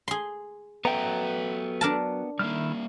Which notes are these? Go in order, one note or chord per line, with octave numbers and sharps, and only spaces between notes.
G#4 C6
F#3 B3 A4 B4 E5 G5 A#5
D4 A#4 A5
D#3 G3 A#3 E4 F6